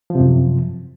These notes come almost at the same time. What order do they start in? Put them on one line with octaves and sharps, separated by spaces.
F3 C3 F#2